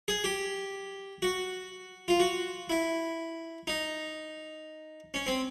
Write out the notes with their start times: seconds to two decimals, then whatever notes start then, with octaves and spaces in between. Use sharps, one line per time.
0.08 G#4
0.24 G4
1.22 F#4
2.08 F4
2.20 F#4
2.70 E4
3.67 D#4
5.14 C#4
5.27 C4